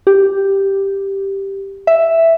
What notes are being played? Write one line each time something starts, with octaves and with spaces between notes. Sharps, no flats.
G4
E5